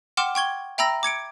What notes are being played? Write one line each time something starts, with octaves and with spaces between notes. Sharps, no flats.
F#5 G5 C6 D6 F6 E7
G5 C#6 G#6 G7
E5 G5 A#5 B5 E6 A#6
D6 G#6 C#7 D7